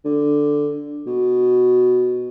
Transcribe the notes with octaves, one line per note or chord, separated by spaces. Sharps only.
D3
B2